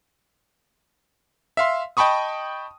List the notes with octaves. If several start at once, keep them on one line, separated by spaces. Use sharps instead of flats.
E5 F5 C6
D#5 G5 A5 B5 C#6 D#6